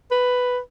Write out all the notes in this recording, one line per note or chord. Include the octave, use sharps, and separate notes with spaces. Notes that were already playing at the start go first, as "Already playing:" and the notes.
B4